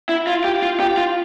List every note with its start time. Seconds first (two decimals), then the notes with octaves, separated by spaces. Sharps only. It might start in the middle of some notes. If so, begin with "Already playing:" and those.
0.09 E4
0.27 F4
0.44 G4
0.62 F4
0.80 G4
0.97 F4